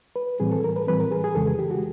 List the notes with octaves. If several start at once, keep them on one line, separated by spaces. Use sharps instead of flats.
B4
A2 E3 G3 C4 G#4
A4
A#4
B4
A2 E3 G3 C4 B4
A#4
G#4
G#4
F2 C#3 E3 G#3 A4
G#4
G4
F#4